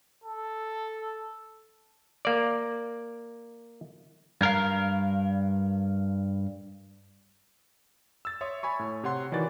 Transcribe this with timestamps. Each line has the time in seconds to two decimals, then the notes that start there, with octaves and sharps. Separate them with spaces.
0.24 A4
2.25 A#3 D5
4.41 G2 A#4 F5
8.25 E6 A6
8.41 C#5 E5 C6 D#6
8.63 C#5 G#5 B5 C#6
8.79 A2
9.03 C3 C#5 F#5 C6
9.32 D#3 E3 F#4 D5 A6